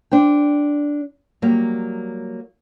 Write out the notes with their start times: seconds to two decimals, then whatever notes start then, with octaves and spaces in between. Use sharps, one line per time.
0.11 D4 C5 G5
1.42 F#3 G3 A#3